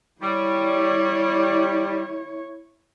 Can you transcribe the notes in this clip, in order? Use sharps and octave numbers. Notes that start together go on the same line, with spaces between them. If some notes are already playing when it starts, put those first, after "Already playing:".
G3 E4 C#5